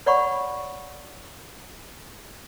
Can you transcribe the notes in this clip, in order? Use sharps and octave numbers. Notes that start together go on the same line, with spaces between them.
C#5 D5 F#5 B5 C#6